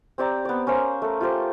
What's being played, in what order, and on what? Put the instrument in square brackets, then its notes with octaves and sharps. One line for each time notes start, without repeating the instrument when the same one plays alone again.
[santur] C4 G4 D5 A#5
B3 D5
C#4 A#4 C5 F5
A3 A#4
F4 G4 C5